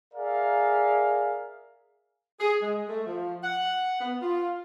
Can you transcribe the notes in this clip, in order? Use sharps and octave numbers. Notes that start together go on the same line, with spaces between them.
G#4 A#4 D5 E5 F5
G#4
G#3
A3
F3
F#5
B3
F4